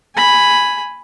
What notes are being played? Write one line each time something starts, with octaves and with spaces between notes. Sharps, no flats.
G#5 B5